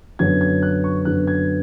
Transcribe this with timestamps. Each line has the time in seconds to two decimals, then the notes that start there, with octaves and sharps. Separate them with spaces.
0.19 F#2 D3 F#3 B3 G#6
0.41 G#6
0.63 F#6
0.84 C#6
1.05 F#2 D3 F#3 B3 F#6
1.27 G#6